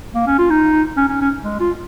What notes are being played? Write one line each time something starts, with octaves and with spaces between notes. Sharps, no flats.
A#3
C#4
F4
D#4
C#4
C#4
C#4
G#3
F4